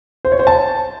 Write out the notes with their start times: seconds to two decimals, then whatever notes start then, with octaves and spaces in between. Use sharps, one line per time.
0.25 C5
0.32 C#5
0.39 C5
0.47 A5